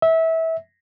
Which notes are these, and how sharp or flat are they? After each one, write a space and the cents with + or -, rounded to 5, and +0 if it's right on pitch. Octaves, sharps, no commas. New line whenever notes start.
E5 -25